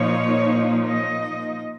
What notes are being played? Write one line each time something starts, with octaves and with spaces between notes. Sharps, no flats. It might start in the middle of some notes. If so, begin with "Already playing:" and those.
Already playing: A#2 F3 A#3 D#4 C#5
D#5